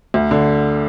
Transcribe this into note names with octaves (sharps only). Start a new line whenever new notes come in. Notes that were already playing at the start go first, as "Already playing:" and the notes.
D2
D3